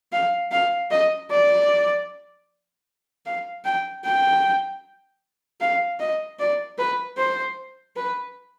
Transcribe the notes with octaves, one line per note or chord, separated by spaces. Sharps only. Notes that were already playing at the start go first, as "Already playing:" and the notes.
F5
F5
D#5
D5
F5
G5
G5
F5
D#5
D5
B4
C5
B4